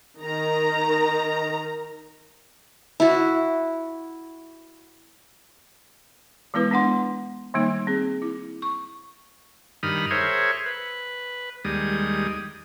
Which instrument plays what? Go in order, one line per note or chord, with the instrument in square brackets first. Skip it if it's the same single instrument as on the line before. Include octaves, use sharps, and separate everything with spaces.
[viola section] D#3 A#5
[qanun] E4 F#4
[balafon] E3 G#3 B3 E4 B4
B3 D4 F#5 C6
D#3 G3 A#3 D#4
C4 G#4
E4
C#6
[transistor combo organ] G2 D#3 B5 D#6 F6
G#4 A#4 C5 C#5 E5
B4
D#2 G3 G#3 D#6